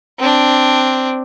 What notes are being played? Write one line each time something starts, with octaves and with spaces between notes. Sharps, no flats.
C4 D4